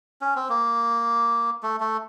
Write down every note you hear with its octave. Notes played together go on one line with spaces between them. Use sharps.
C#4
C4
A#3
A3
A3